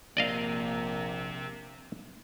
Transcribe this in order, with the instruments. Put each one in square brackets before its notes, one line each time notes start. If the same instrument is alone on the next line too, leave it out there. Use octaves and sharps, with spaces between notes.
[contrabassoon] A#1 [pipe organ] C3 C4 [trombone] A#3 [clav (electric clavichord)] D5 D#5 F5